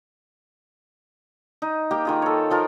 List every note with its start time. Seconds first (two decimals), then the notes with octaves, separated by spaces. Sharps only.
1.62 D#4
1.91 A#3 G4 G5
2.05 D#3 F4 G#4
2.22 A4 C#5
2.51 F3 F4 A#4